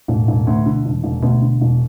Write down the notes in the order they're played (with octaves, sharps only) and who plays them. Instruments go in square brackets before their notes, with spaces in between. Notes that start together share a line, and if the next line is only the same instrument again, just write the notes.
[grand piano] E1 [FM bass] A2
[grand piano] E1
D2
[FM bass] B2 [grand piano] D3
[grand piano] E1
[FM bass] E3
[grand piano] E1 [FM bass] D3
[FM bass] C3
[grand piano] D2 [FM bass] B2
[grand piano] D3
E1